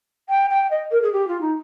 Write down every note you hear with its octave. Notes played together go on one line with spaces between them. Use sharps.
G5
G5
D#5
A#4
G#4
G4
F4
D#4